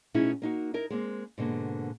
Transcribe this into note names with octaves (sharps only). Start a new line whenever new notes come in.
B2 A3 C#4 D#4 E4 G#4
A#3 D#4 F#4
D#4 E4 A#4
G#3 A#3 C4
G#2 B2 D3 A#3